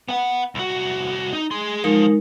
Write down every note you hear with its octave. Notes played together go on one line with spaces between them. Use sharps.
B3 F#5
C2 F#4
D#4
G#4 C6
F3 G#3 D#4 A#4